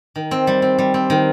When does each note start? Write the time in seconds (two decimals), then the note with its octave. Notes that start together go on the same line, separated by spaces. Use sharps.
0.16 D#3
0.31 C4
0.47 G3
0.62 C4
0.79 G3
0.94 C4
1.10 D#3